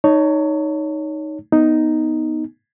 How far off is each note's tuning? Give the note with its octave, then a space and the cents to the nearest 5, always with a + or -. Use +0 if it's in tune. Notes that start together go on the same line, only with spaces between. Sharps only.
D#4 +0 C#5 +20 A5 +40
B3 +0 D#4 +0